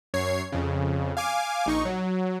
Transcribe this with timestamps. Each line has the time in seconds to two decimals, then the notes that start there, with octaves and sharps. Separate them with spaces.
0.14 F#2 C#5 G#6 C7
0.52 F2 C#3
1.17 F5 G#5 D6
1.66 A#1 D#4 C#6
1.85 F#3